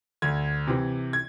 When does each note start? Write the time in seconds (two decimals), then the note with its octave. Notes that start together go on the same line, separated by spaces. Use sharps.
0.22 D2 G#6
0.67 C3 E3
1.13 G#6